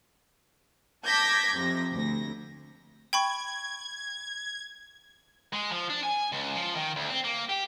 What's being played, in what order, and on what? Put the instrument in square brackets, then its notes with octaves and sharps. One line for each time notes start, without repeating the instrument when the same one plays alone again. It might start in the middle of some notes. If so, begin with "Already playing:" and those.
[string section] A5 D6 G6 G#6 A#6 B6
F2 C3 A#6
D2 A#6
[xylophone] G5 B5 C#6 [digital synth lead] G#6
[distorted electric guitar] G#3
F3
D4
G#5
C#2
F3
D#3
D2
C4
A#3
G4